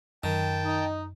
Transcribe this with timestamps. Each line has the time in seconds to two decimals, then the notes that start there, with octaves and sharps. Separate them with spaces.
0.24 F#2 D#3 G5 A5
0.65 D#4